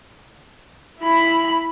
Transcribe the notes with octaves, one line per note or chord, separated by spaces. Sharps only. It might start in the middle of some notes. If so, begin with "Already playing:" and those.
E4 B5